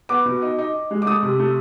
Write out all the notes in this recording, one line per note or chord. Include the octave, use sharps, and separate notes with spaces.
B3 D6
B2
D#4
D#4
D#4
G#3
D6
A3 D#6
C3
A3